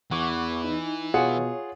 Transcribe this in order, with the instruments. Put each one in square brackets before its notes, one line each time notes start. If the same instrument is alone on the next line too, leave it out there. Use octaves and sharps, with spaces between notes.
[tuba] E2 [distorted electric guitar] E3 [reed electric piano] F#5 C#6 D6
[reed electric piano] D#4
[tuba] B2 [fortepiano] F4 G#4 F#5 [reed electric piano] C#5